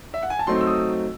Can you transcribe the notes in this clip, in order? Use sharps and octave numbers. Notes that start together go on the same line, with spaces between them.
E5
F#5
G#5
A5
F#3 A3 C4 D#4 C6
E6
D#6